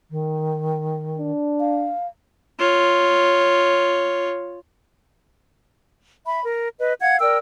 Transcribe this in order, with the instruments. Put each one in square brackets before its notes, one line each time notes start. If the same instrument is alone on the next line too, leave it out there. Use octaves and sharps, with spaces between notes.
[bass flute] D#3
[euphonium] D4
[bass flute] F5
[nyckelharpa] F4 C#5
[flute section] E5 B5
A#4
B4 D#5
F5 F#5 G#6
A#4 D5 G5 E6